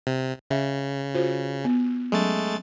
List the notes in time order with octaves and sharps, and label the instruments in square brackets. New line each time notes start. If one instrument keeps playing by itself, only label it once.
[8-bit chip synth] C3
[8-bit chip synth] C#3 [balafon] C#4 E5
[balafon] F4 F#4 C5
B3
[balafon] F#3 C#4 [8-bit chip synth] G#3 A3 A6